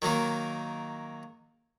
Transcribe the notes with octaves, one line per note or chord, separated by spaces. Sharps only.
D#3 F#3 A#3 D#4